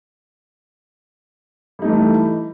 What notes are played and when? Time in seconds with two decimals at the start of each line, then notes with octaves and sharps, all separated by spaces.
1.79 G3
1.82 D#4
1.85 A3
1.88 E3